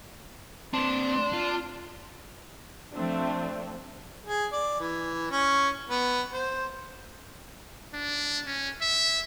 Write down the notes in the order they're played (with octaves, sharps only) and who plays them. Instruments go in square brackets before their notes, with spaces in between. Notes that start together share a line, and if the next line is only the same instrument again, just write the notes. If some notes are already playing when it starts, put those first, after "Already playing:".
[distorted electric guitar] C4 B4 [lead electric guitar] D4 [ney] C6
[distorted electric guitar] F4
[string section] F3 A3 C4 D4
[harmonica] G#4
D5
E3
C#4
B3
C5
[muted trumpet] D4
C#4
E5